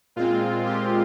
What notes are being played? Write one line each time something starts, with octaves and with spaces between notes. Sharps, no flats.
A#2 G#3 C4 F4
G4